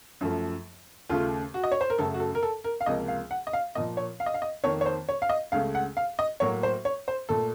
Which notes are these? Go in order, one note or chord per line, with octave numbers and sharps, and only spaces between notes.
F#2 F3 A3
D#2 C#3 A3 F4
F#4
D#5
C#5
C5
A#4
F#2 C#3 A3 A4
F#4
A4
A#4
A4
A#4
F5
C#2 C3 F3 A#3 D#5
F5
F#5
D#5
F5
A#2 F3 A#3 D#5
C#5
F5
D#5
F5
D#5
F2 D#3 A#3 C#5
C#5
C5
C#5
F5
D#5
C#2 C#3 A3 F5
F#5
F5
D#5
A2 F#3 A#3 C#5
C5
C#5
C5
A#2 A3 A4